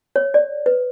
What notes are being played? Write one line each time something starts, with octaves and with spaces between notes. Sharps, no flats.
C#5
D5
B4